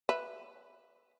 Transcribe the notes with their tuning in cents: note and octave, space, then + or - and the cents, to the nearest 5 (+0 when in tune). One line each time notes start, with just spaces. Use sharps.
B4 +0 E5 +0